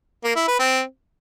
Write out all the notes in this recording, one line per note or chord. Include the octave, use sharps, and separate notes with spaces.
A#3
E4
B4
C4